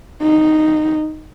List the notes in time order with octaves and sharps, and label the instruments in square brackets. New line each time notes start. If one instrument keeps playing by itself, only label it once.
[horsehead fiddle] D#4